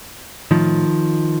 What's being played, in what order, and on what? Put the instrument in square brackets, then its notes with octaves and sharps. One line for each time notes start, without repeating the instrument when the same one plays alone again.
[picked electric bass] A2 D#3 F3